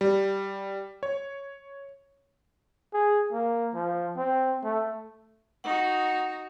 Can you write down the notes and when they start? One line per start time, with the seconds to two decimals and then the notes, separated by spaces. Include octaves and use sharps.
0.01 G3
1.03 C#5
2.94 G#4
3.32 A#3
3.75 F3
4.17 C4
4.64 A3
5.64 D#4 F#4 F#5